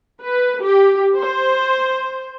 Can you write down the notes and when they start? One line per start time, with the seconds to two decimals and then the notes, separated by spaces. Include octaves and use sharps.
0.20 B4
0.63 G4
1.18 C5